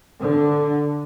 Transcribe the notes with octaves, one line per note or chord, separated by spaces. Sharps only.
D3